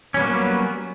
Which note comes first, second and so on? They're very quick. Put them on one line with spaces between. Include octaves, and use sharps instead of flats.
C#4 G3 B3 A#3 F#3